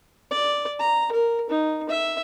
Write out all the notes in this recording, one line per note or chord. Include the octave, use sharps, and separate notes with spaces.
D5
A#5
A#4
D#4
E5